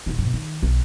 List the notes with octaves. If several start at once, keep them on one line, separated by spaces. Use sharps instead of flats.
D#1 D#4
G2 B2
D#3
B1